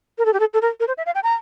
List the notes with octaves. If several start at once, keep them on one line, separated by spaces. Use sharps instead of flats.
A#4
A4
G4
A4
A4
A#4
A#4
C5
E5
F5
G5
A#5